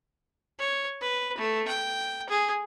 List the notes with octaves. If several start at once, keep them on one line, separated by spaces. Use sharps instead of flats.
C#5
B4
A3
G5
G#4